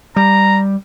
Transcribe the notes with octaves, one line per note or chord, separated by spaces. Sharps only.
G3 A#5